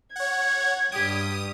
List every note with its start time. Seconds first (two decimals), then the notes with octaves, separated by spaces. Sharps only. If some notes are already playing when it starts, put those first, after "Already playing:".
0.16 C#5 F#5 G#6
0.92 G2 G4 D#6